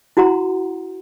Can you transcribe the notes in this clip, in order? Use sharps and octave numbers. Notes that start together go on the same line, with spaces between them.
E4 F#4 F#5 A#5 C6